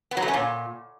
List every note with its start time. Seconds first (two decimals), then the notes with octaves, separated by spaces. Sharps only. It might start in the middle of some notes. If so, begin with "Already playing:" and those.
0.11 B3
0.17 F#3
0.22 A3
0.28 C#4
0.34 A#2